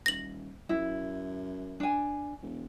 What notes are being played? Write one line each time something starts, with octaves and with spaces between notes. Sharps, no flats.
D#1 A#6 F#7
F#2 E4
D4 G#5
E1